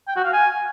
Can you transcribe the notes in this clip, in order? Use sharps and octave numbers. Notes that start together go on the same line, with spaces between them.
G5
F#4
F5
G#5